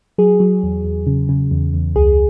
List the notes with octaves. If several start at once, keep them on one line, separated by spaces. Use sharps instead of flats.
F#3 G#4
F#3
E2
E2
C#3
C#3
E2
E2
C#2 G#4